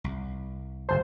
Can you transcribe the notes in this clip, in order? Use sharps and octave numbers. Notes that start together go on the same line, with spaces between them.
C2
G1 C5 G#5 A5